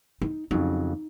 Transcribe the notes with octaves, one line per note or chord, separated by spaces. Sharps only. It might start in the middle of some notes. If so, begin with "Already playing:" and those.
D#4
F2 C#3 F#3 D#4